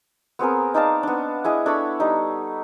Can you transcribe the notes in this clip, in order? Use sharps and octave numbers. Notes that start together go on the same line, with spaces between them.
B3 C4 G#4 A#4
D#4 D5 F5 A5
B3 D4
E4 G#4 D#5 D6
D4 A4 C#5 B5
G3 D#4